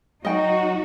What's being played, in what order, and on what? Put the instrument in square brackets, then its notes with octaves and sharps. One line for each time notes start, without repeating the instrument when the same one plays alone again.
[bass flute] F#3 [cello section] D#4 F#4 [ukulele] D#5 G5